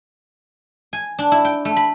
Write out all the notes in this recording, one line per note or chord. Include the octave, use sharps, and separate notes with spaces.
G#5
D4
E4
G5
A3
B5